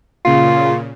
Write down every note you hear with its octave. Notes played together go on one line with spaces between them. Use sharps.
A#2 C#3 F4